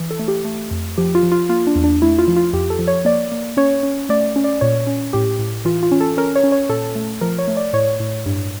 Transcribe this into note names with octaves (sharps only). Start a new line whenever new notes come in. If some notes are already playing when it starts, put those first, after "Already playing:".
Already playing: E3
A4
A3
G4
A3
F2
F3 G4
F4
F3
F4
A#3 F4
D4
E2
D4
A3 E4
F4
F3
F4
F2 G4
A4
F3
C#5
A#3 D5
A#3
C#4 C#5
C#4
A3 D5
C#4
D5
A#2 C#5
C#4
A2 G4
A2
E3 F4
F4
C#4
A4
C#4 A#4
C#5
C#4
C#5
A#2 A4
A3
F3 A#4
C#5
A3
D5
A2 C#5
A2
G2